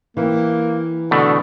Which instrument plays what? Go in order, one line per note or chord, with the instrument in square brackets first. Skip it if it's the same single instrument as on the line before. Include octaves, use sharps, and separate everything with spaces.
[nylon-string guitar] E3 C4 [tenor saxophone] A#3
[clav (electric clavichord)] B2 A3 [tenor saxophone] D3